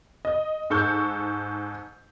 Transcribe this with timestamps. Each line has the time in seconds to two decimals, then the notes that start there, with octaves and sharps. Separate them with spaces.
0.25 D#5
0.70 G#2 A4 C#6 G6